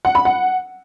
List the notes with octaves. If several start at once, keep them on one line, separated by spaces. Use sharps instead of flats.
F#5
B5
F#5